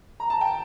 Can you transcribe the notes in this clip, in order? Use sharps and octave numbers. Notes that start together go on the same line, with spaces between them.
A#5
A5
G5